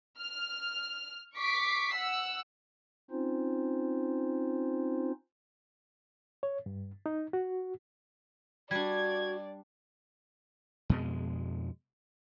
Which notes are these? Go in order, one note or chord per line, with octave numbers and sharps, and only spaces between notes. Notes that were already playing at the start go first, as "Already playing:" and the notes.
F6
C#6 D6 B6 C7
F#5 E6
C4 C#4 D#4 F4 C5
C#5
G2
D#4
F#4
G3 D4 F#4 D5 G#6
F2 B2 G#3